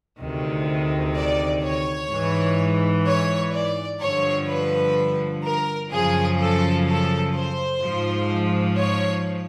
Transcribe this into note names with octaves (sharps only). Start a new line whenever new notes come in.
D2 C3 D#3
D5
C#5
G#2 E3
C#5
D5
G2 D3 F3 C#5
B4
A#4
F#2 C#3 F3 G#4
A4
A4
C5
G#2 F3
C#5